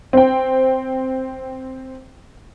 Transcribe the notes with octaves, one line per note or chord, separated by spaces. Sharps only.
C4 G5